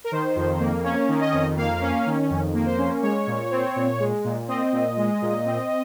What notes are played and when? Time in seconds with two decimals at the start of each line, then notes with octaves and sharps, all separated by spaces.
0.04 A#4
0.12 D#3 C5
0.36 F2
0.60 A#3
0.84 C#4 C#5
1.08 D#3
1.21 D#5
1.33 F2
1.57 A#3 F5
1.81 C#4
2.06 D#3
2.30 F2
2.54 A#3
2.66 C5
2.78 C#4
3.02 G#3 C#5
3.27 A#2
3.51 C4
3.76 A#2
4.00 G#3
4.24 A#2
4.48 C4 D#5
4.72 A#2
4.97 G#3
5.22 A#2
5.45 C4